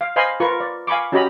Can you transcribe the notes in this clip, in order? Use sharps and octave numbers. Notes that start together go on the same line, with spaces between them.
F5
C5 D#5 F5 G#5 B5 C6
F4 A#4 B4 C#6
D5
F5 G#5 B5 C#6 D6
C#4 F#4 G4 D#5 A#5 B5